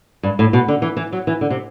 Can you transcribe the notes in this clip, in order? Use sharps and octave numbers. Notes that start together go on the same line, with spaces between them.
G2
A2
B2
D3
E3
E3
F#3
E3
D3
C3